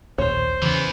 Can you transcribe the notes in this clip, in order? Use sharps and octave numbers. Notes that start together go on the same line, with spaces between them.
A#1 D#2 A2 C5 C#5
E2 C#3 E3 B3